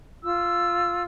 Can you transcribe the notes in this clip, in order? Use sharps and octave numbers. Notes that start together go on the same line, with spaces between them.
F4 E6